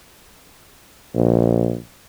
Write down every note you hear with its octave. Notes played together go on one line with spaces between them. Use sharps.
A#1